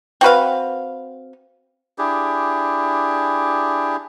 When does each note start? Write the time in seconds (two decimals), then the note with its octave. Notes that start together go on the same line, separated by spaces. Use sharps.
0.21 C4 F#4 B4 F5
1.98 D4 E4 G4 G#4